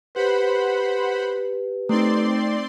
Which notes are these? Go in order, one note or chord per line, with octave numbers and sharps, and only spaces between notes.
G4 B4 C5 F#5 B5
A3 C4 D#4 D5 C6